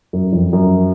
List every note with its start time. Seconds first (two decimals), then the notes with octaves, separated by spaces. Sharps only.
0.13 F#2
0.33 F2
0.53 F#2